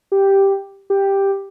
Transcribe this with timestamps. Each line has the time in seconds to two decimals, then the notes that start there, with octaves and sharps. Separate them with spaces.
0.12 G4
0.90 G4